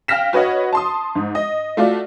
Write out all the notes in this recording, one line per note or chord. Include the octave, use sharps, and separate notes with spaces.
F5 G5 F6 A#6 B6 E7
F#4 B4 C#5 D#5 F#5
A5 C6 D#6
G#2
D#5
A3 F4 F#4 D5